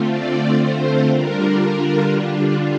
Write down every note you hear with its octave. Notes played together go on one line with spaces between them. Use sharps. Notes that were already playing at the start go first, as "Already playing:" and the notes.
Already playing: D3 A3 C4 F4
D5
C5
D3 G3 D4 F4 A#4
A#4